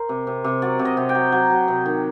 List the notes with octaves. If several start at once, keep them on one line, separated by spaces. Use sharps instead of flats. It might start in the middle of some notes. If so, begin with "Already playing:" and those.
Already playing: A#4 C5
C3
C3
C3
F#3 D5
C3
D#5
C3
G5
F#3
F#3
F#3
C3
D#3